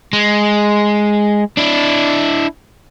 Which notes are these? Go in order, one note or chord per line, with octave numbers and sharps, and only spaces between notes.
G#3
D4 E4